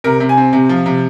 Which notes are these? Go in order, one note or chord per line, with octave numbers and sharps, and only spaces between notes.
C3 A#4
C3
G#5
C4
C3
F3
C3